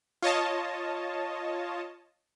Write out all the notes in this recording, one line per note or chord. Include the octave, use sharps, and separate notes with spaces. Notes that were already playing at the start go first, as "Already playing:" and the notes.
F4 C#5 D#5 A5